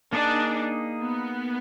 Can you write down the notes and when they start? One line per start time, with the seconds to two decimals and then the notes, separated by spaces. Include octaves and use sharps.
0.12 A#3 D4 D#4 G#4
1.01 B3